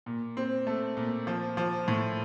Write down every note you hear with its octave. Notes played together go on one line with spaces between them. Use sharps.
A#2
C4
A3
A#2
F3
F3
A2